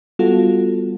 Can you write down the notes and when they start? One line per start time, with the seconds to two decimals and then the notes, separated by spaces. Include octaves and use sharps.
0.19 G3 B3 F4 F#4 A4